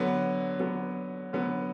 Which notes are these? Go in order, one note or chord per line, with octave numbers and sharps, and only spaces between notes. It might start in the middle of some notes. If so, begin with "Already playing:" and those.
Already playing: D3 F#3 B3
D3 F#3 B3
D3 F#3 B3